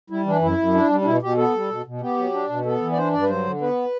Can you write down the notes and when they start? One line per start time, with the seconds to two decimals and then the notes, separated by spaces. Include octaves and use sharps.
0.10 G3 E4
0.26 E3 D4
0.42 F#2 E4
0.58 F#2
0.74 D4
0.89 G3
1.01 D4
1.05 B2 E4
1.22 B2 G4
1.37 B3 A4
1.54 G3
1.70 B2
1.85 B2
2.01 B3 G4
2.17 F#3
2.34 D4
2.49 B2
2.65 B3 A4
2.81 E3
2.92 D5
2.97 D4 C5
3.13 G2 D5
3.22 B4
3.28 F#3 C5
3.45 D3
3.61 B3 B4